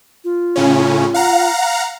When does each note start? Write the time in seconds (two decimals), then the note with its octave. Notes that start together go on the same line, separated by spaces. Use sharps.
0.24 F4
0.56 A2 C#3 C#4
1.14 F5 F#5 A#5